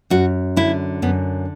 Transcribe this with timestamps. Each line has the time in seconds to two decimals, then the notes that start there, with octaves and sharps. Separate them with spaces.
0.10 F#2 F#4
0.56 D3 E4
1.02 F#2 B3